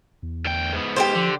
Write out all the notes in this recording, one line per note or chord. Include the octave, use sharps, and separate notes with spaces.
E2
D2 G5
G#2 B3
G4 A4 C5
D3 F3